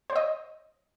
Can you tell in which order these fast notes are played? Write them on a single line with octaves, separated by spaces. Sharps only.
C5 C#5 D#5